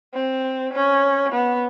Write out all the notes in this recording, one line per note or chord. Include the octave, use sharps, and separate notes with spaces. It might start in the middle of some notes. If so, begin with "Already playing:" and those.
C4
C#4
B3